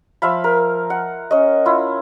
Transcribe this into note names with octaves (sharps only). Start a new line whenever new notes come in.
F3 E5 F5 B5
A#4
F#5
C#4 D#5
E4 F4